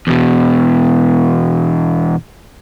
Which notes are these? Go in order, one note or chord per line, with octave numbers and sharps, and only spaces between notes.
E2 B2